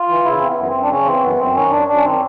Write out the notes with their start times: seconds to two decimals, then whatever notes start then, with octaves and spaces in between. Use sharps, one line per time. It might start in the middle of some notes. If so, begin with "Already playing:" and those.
Already playing: F4
0.08 E3
0.25 C#3 E4
0.40 E3 C4
0.46 B3
0.57 F#2 B3
0.68 C4
0.74 F#2
0.83 D4
0.90 C#3 C#4
1.06 E3 C4
1.22 F#2 B3
1.39 F#2 C4
1.55 D#3 C#4
1.71 F#2 D4
1.88 F#2 D4
1.96 C#4
2.04 D#3 C4